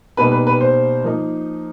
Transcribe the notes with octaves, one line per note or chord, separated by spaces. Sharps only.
B2 G3 A#3 D#4 B4
B4
B4
C5
F3 A#3 D#4